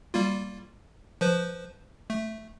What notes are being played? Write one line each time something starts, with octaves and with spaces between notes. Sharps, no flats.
G3 A#3 F4
F3 B4 C5
A3